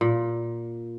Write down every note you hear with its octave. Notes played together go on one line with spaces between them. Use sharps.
A#2